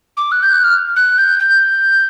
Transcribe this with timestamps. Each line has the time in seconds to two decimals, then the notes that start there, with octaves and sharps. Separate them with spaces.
0.17 D6
0.31 F#6
0.42 G6
0.53 F#6
0.63 F6
0.96 F#6
1.18 G6
1.39 G6